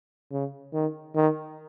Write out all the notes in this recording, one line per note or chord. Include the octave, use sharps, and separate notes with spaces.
C#3
D#3
D#3